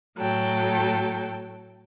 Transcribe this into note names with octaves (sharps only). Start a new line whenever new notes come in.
A2 F#3 A4 G5